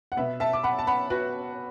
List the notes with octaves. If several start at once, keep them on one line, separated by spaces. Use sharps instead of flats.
F#5
B2 B3 B4 E5
E5 A5
D6
F#5 B5
A5
F#5 B5
F#4 B4